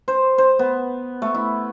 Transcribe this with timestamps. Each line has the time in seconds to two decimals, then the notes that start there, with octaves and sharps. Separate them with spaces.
0.08 C5
0.38 C5
0.59 B3
1.22 A3
1.35 E4